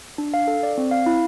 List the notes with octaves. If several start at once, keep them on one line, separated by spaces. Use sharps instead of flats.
D4
F5
A4
D5
C4
F5
E4